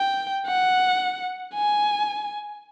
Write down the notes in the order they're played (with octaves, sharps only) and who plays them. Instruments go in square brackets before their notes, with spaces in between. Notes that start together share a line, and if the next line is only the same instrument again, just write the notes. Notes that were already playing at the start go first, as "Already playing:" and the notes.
Already playing: [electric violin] G5
F#5
G#5